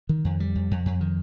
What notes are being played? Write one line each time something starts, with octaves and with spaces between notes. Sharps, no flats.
D#3
F2
G3
F2
F2
F2
D#3